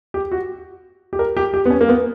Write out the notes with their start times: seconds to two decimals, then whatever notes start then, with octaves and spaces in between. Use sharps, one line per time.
0.14 G4
0.32 F#4
1.13 G4
1.19 A#4
1.37 G4
1.54 G4
1.65 B3
1.70 C#4
1.81 A#3
1.89 B3